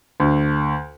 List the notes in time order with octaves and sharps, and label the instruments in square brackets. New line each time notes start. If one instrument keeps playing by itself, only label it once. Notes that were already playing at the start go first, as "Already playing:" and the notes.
[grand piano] D2